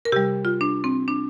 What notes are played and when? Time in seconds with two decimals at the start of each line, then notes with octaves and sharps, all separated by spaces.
0.05 A#4
0.12 C3 G3 G4
0.45 F4
0.61 D4
0.84 C4
1.08 D4